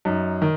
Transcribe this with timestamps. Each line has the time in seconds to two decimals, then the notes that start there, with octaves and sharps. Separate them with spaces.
0.05 F#2 D#4
0.42 D#3